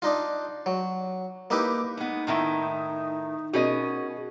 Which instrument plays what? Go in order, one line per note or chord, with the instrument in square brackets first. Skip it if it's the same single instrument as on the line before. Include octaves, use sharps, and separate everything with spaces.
[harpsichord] D4 D#4 F4
F#3
A#3 D#4 E4 G4 B4
[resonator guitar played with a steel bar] G#3 B3 [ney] D#4
[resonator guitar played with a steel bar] A2 D#3 E4
[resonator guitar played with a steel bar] B2 C#4 D#5 [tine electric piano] F#4 G#4 A#4